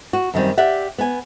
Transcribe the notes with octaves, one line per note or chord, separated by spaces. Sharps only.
F#4
F#2 D#3 G3 C4
G4 D5 E5 F#5
B3 G#5